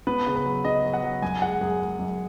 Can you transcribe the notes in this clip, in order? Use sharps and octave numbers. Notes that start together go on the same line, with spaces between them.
B3 B4
C#3
B4
F#3
C#3 D#5
F#3
F#5
F#3
F#2 G#5
G#3 F#5
F#2 G#4
G#3
F#2